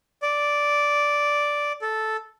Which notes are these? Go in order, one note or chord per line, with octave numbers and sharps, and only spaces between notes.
D5
A4